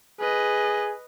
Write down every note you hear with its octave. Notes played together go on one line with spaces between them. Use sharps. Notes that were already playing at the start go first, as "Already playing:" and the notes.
G#4 B4 D#5